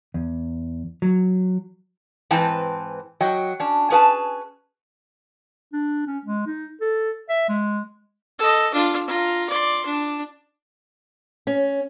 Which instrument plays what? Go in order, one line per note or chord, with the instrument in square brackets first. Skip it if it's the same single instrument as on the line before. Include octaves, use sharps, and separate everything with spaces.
[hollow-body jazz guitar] E2
F#3
[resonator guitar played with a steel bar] G#2 E3 C4 B4 G5 A5
F#3 D#5 G5
C#4 D4
C#4 G#4 B4 G5 A5
[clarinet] D4
C#4
G#3
D#4
A4
E5
G#3
[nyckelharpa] A4 D#5
D4 F4
F4 A#5
D5 C6
D4
[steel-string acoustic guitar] C#4